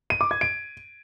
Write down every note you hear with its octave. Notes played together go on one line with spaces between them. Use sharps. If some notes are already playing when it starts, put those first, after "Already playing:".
D#7
D6
G#6
D7